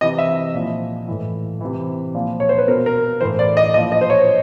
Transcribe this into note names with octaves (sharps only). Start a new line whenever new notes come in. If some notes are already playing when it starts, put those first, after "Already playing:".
C3 E3 D#5
E5
A#2 F3
A2 E3
C3 E3
A#2 F3
C#5
C5
B4
B2 A#4
A#4
A2 E3 C5
D5
D#5
A#2 F3 D#5
D#5
C5
C#5